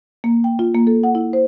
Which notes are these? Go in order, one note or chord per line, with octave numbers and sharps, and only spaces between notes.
A#3
G5
F4
A#3
A4
F#5
E4
C5